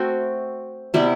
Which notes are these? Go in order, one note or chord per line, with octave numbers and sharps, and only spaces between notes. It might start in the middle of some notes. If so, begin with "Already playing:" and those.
Already playing: A3 C4 F#4
C3 G3 B3 E4